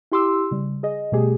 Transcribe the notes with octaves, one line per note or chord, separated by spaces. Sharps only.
E4 G4 C6 D6 E6
C#3 G3
G#4 D#5
B2 G3 A3 G4 G#4